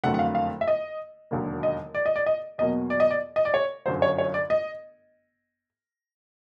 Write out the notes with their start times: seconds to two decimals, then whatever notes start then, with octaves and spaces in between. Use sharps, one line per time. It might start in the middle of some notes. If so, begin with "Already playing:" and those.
0.04 F#1 F2 D3 F#3 A3 F#5
0.14 F#5
0.19 F5
0.35 F5
0.61 E5
0.68 D#5
1.31 E1 D#2 D3 F#3 A#3
1.63 D#5
1.95 D5
2.06 D#5
2.16 D5
2.26 D#5
2.58 E2 B2 F#3 A#3 D#5
2.90 D5
3.00 D#5
3.11 D5
3.36 D#5
3.45 D5
3.54 C#5
3.86 G1 F#2 D3 F#3 C5
4.02 C#5
4.18 C#5
4.34 D5
4.50 D#5